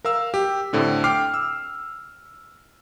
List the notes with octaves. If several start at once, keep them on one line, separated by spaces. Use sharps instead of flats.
A#4 F5 E6
G4
A2 D3 C4
G5 D6 F6 C7
E6